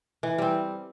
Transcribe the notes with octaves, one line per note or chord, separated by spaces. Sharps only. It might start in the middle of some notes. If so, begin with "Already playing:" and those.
E3
G3 C4